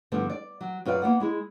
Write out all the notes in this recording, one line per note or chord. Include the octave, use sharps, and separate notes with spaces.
G2 D3 F3 A3 B3
D5
F#3
F#2 F4 B4 D5 F5
A#3 B3 F#5
G#3 E4 G#4